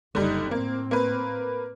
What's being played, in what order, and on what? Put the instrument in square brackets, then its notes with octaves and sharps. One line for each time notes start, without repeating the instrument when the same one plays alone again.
[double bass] F#1 D#4 [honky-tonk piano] D3 G3
[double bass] A2 C4 [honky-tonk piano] A#3
[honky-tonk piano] A#3 B4